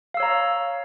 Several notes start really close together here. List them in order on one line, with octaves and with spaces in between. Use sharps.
F5 E6 C#5 A#5